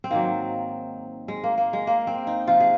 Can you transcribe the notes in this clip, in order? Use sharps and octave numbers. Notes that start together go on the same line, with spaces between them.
C4
G#2 D#3 F#3 A#3
G#3
A#3
A#3
G#3
A#3
C4
D#4
C3 F3 F4
G#4